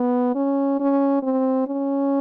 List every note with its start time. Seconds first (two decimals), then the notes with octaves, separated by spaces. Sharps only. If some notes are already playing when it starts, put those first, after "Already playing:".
Already playing: B3
0.35 C#4
0.80 C#4
1.23 C4
1.67 C#4